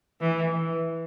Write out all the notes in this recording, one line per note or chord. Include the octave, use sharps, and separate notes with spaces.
E3